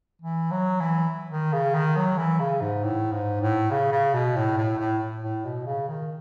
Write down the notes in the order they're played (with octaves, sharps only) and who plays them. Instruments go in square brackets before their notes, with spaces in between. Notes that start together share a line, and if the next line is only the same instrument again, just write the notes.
[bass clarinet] E3
F#3
E3
D#3
C#3
D#3
F#3
E3
C#3
G#2
A2
G#2
A2
C#3
C#3
B2
A2
A2
A2
A2
B2
C#3
D#3